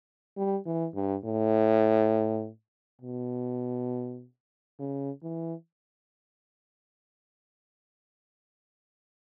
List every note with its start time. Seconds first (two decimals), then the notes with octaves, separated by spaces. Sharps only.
0.37 G3
0.66 E3
0.95 G2
1.25 A2
3.01 B2
4.79 C#3
5.23 E3